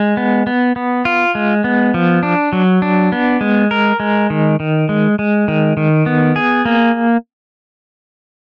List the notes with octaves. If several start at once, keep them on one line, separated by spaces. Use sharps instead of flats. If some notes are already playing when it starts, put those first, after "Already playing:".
Already playing: G#3
B3
B3
B3
F4
G#3
B3
F3
D4
F#3
D4
B3
G#3
A#4
G#3
D#3
D#3
G#3
G#3
D#3
D#3
B3
G#4
A#3